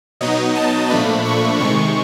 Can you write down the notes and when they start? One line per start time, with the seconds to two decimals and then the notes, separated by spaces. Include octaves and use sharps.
0.21 B2 F#3 B3 D#4 D#5
0.56 A5
0.90 A#2 F3 A3 D4 B5
1.25 C#6
1.60 C3 D#3 G#3 C#6